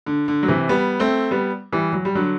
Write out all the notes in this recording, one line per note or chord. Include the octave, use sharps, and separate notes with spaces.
D3
D3
F#3
C3 E3
G3 B3
A3 C4
G3 B3
E3 G3
F#3
G3
D3 F#3